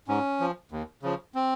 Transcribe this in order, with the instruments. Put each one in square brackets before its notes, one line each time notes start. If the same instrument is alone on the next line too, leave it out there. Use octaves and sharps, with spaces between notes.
[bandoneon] G#2 C#4
F3
D#2
C#3 F3
C4